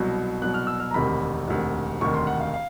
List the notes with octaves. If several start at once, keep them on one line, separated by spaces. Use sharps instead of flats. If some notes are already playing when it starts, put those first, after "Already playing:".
Already playing: C2 B2 F#3
C2 B2 F#3 F#6
F6
E6
F6
A#5
E1 D2 C3 D#3 B5
E1 D2 C3 D#3
E1 D2 C3 D#3 C#6
C6
F#5
F5
F5